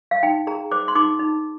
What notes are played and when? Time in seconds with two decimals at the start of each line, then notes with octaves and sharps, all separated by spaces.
0.11 F5
0.23 D#4 G5
0.47 G#4 A#5
0.71 C5 D6
0.88 C6
0.95 D#4 D6
1.19 D#4